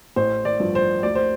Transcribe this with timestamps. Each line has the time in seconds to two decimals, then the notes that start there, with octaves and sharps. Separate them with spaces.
0.16 A1 C5
0.45 D5
0.60 G2 F3
0.75 C5
1.03 D2 D5
1.15 C5